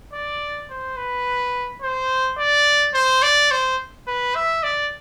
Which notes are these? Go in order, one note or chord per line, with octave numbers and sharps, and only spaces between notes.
D5
C5
B4
C5
D5
C5
D5
C5
B4
E5
D5